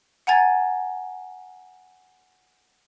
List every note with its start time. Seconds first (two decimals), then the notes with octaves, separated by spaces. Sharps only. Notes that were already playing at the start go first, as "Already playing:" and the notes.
0.27 F#5 G#5 A#5 G#6 A6